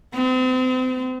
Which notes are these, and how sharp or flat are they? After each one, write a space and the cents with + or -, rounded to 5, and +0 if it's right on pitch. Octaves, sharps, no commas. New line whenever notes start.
C4 -35